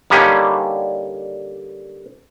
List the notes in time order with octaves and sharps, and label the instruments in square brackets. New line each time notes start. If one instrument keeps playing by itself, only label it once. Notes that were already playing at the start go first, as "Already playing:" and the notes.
[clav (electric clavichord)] D3 G3 A#3 C#4 D#4